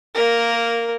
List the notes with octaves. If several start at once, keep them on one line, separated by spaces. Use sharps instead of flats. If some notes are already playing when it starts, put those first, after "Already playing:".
A#3 A#4